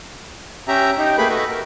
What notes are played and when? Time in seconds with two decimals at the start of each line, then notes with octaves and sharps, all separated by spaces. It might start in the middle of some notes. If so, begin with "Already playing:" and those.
0.68 C#4 G4 E5 A#5
0.98 D#4 G4
1.18 A3 A#3 G4 G#4 B4 B5
1.29 A3 F#4 B4 D#5 E5
1.49 A#4